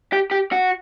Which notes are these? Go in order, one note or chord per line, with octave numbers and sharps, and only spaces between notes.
G4
G4
F#4